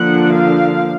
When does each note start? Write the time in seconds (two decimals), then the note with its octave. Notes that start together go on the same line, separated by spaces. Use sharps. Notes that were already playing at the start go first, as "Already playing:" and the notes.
Already playing: D3 F3 A#3 D4 F#5
0.31 F5